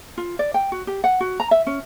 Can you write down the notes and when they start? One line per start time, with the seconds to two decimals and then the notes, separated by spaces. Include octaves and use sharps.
0.18 F4
0.39 D5
0.54 G5
0.72 F#4
0.87 G4
1.04 F#5
1.21 F#4
1.40 A#5
1.51 E5
1.67 C#4